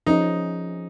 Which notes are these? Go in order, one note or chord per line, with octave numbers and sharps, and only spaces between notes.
F3 C#4 D#4 G#4